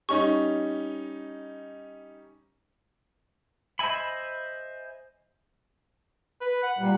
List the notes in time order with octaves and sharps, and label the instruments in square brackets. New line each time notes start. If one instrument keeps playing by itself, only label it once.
[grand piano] G3 C#4 D#4 [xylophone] C#6
[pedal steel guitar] C5 D#5 E5 G#5 B5
[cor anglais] B4
F#5
[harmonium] A#2 G3